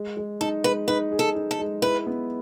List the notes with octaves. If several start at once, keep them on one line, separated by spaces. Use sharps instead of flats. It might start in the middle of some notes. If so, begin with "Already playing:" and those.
Already playing: G#3
G#3
D#4 A4
G#3 B4
D#4 B4
G#4
A4
D#4
A4
G#3
E4 B4
B3